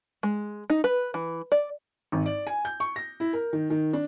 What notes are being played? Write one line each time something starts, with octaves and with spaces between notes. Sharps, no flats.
G#3
D#4
B4
E3
D5
G#1
D5
G#5
G6
C#6
A#6
E4
A#4
D#3
D#3
D4